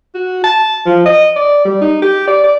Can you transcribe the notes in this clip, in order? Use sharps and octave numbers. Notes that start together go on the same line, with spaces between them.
F#4
A5
F3
D#5
D5
G3
D#4
G4
D5
D5